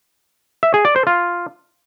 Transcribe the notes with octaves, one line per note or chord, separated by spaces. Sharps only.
E5
G#4
D5
C5
F4